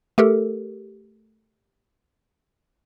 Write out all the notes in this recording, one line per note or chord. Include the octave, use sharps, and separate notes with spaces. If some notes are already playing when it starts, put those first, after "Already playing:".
A3 G4 A4 A#4